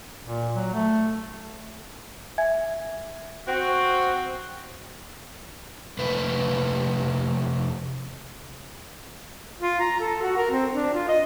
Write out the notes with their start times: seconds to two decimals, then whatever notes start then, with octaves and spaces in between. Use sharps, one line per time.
0.25 A#2
0.55 F#3
0.73 A3
2.38 E5 G#5 G#6
3.48 C4 F#4
5.99 F2 C3 A3 B4
9.60 F4
9.80 A#5
10.00 A4
10.21 F#4
10.37 A#4
10.50 C4
10.72 D4
10.94 F4
11.08 D#5